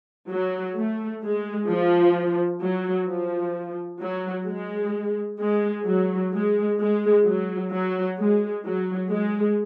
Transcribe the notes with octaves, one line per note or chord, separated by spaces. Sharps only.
F#3
A3
G#3
F3
F#3
F3
F#3
G#3
G#3
F#3
G#3
G#3
F#3
F#3
G#3
F#3
G#3